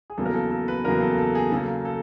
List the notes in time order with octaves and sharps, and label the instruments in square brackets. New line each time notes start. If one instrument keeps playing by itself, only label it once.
[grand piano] G#4
E2 C#3 F#3 A#3 A4
A#4
A4
A4
B4
E2 C#3 F#3 A#3 A#4
A4
A4
G#4
C#3 F#3 A#3 A4
A4